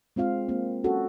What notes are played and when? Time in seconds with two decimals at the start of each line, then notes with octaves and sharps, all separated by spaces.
0.16 G#3 C4 F4 F5
0.49 A#3 C4
0.84 C#4 F#4 A4